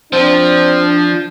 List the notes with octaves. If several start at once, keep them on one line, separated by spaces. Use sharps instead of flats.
F3 C4 D4